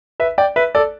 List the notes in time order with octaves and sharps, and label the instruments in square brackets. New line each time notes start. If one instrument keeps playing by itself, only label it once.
[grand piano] B4 E5
D5 G5
B4 E5
A4 D5